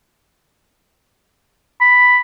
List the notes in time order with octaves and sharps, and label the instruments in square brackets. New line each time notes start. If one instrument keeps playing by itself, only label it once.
[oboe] B5